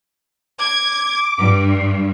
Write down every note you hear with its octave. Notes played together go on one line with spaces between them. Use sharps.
D6 G#6
G2